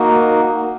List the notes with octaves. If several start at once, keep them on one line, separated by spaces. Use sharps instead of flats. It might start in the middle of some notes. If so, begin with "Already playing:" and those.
Already playing: A#3 D#4 F#4